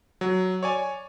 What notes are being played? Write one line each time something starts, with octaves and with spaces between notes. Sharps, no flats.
F#3
C#5 D5 G#5